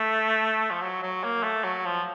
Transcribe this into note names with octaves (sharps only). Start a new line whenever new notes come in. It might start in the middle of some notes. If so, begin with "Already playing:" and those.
Already playing: A3
F3
F#3
F#3
A#3
A3
F#3
F3